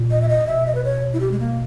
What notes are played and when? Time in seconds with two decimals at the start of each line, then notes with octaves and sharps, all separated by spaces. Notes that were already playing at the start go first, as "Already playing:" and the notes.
Already playing: A#2
0.11 D#5
0.22 E5
0.29 D#5
0.47 B2 E5
0.66 D#5
0.75 B4
0.85 C#5
1.13 E4
1.20 G4
1.31 G#3
1.40 A#3